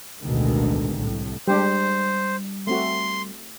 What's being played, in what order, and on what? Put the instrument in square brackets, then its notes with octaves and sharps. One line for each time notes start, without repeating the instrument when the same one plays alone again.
[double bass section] A1 D2 B2 D3 D#3 G#3
C2 A2
[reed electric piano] G3 [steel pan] G#3 D4 G4 [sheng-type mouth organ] C5
[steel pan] A3 C4 F#4 [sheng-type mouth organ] C6